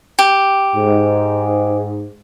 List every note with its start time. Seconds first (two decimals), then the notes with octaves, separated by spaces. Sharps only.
0.19 G4
0.76 G#2